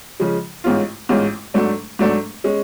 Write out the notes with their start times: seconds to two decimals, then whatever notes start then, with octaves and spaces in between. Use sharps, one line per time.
0.20 C#3 F3 G#3
0.64 A1 G#2 G#3 C#4 F4
1.09 A1 G#2 G#3 C#4 F4
1.54 G#2 F#3 A3 D4
1.99 G#2 F#3 A3 D4
2.44 G#3 C#4